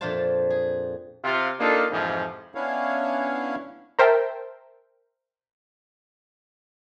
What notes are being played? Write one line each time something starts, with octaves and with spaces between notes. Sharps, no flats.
F2 A#2 D4 F4 C5 A5
G#4
C3 F4
A#3 D4 D#4 F4 A4
F2 G#2 C3 E3 F3
B3 C#4 D4 E4 C#5 F5
A#4 C5 E5 G5 A5